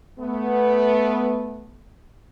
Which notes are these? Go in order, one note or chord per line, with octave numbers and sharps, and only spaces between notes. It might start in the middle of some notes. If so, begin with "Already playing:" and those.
A3 B3